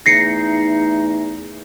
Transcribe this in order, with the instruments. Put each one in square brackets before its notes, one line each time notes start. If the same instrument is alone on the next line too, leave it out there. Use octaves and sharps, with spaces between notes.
[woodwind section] E2 A3 D#4 [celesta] A#6 C7 C#7